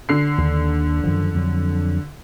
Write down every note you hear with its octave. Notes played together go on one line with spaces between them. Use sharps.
D3 C7
D#2
F#2 D#3 F3
F2 F#3